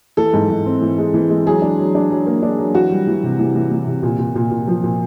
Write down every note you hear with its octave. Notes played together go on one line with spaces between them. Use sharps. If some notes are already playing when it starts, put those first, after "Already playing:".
E3 A4
G#2
G#2
C4
E3
G#3
E3
G#3
F#3 G#4
D4
F#3
D4
F#3
A#3
D4
F#3
E3 F#4
G3
E3
C3
E3
E3
E3
C3
A#2
A#2
A#2
A#2
F3
A#2